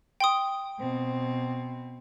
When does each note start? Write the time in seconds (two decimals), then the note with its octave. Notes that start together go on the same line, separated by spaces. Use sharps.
0.20 G5 C6 D#6
0.79 B2 C4